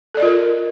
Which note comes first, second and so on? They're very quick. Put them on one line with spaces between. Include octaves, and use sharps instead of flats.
A4 D5 D#5 F4 A#4